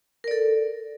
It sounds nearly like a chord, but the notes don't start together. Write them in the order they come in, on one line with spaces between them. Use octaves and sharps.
A#4 D5 A4